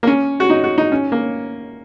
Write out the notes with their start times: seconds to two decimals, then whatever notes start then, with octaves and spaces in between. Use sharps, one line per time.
0.03 A#3
0.07 C#4
0.40 F#4
0.50 D#4
0.64 F#4
0.78 D#4
0.92 C#4
1.12 A#3